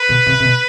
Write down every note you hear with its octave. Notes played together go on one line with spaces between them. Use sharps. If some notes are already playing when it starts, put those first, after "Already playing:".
Already playing: B4
B2
C3
C3
B2